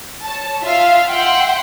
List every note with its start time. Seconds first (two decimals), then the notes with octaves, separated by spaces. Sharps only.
0.24 C#5 A5
0.62 F4 E5 F5
1.07 E5 F#5 G5 C6 G6